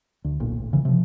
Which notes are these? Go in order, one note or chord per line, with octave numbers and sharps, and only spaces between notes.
D2
D1 B1 A#2
A1
F1 C#3 E3
C3 F3